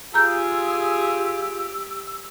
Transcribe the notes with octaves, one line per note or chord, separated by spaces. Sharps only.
F4 G4 G#4 A#5 E6 G6